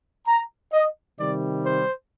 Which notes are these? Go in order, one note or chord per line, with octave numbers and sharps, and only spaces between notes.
A#5
D#5
C3 D#3 G3 D5
C5